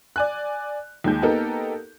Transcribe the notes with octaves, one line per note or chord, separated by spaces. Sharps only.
D5 G#5 F#6
D#2 G#3 G6
A#3 B3 D#4 G4 A4 A#4